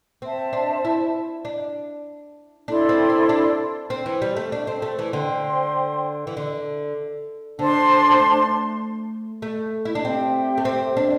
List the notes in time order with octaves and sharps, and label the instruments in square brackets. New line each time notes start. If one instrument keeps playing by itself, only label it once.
[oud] C4 [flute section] C5 E5 A5
[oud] D4
E4
D4
[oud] D4 [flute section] E4 A4 D5 C6
[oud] C4
D4
D4
C4
E3
G3
A3
D4
C4
A3
E3
[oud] D3 [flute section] C5 G5 C6
[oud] E3
D3
[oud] D3 [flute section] D4 C5 A5 C6
[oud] C4
A3
A3
E4
D4
[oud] C4 [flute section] G4 E5 G5
[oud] A3
C4
D4